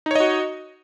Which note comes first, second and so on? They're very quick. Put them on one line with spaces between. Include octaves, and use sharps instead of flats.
D#4 C#5 D#5 F#4